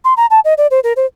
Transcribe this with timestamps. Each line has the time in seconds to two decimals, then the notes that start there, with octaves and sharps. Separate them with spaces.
0.04 C6
0.17 A#5
0.31 A5
0.45 D#5
0.58 D5
0.71 C5
0.84 A#4
0.96 C5